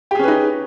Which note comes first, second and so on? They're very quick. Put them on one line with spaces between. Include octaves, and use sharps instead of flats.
G4 G#4 C#4 B4 D#4